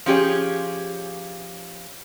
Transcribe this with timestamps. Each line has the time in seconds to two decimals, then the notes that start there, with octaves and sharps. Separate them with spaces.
0.06 F3 C#4 G4 G#4 C#5